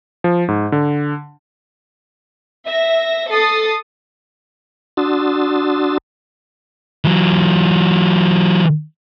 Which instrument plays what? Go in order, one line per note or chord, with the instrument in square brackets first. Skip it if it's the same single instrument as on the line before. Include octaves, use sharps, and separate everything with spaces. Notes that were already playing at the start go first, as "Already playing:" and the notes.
[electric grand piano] F3
G#2
D3
[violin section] E5 A#6
A4 D#6 A6 C7
[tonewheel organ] D4 F#4 C6 D#6 E6 A6
[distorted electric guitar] E3 F#3